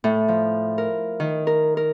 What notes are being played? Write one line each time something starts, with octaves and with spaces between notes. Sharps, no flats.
A2
F3
A#4
D#3
A#4
A#4